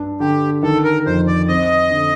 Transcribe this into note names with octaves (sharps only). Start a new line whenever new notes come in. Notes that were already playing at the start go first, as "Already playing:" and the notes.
Already playing: G2 D4
D3 G4
D#3 A4
A#4
F2 C5
D5
C4 D#5
D3